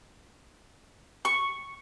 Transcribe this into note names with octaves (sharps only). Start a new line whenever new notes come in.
C#6